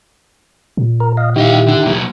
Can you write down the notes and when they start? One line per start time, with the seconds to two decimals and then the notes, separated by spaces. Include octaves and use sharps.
0.77 A#2
1.00 A#4
1.17 D#5 F5
1.36 B2 D#3 E4 G4 D#5 F5
1.67 D3 D4
1.86 B2 F#3 A#3